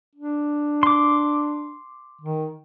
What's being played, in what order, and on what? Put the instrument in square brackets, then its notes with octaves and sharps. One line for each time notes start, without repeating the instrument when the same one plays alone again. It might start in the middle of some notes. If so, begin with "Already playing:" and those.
[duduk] D4
[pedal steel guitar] C6 D6
[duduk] D#3